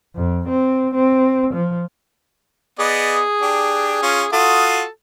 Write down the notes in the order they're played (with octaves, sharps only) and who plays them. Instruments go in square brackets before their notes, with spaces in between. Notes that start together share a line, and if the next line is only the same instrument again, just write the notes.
[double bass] F2
C4
C4
F3
[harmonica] B3 D5 D#5 [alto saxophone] G#4
[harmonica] D4 G4
C#4 F4
[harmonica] F4 F#4 D#6 [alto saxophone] A4